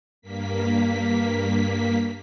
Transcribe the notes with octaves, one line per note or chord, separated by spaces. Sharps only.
G2 A#3 B6